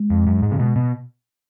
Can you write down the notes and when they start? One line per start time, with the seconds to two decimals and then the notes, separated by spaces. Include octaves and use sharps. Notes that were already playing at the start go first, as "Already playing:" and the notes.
Already playing: G#3
0.10 F2
0.27 F#2
0.42 G#2
0.52 C#3
0.59 B2
0.76 B2